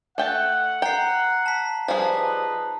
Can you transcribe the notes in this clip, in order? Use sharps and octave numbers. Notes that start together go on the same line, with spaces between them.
A3 F#5 G5 A5
G5 A#5 C7
A5 B6
F3 G3 D#4 G#4 B4 A5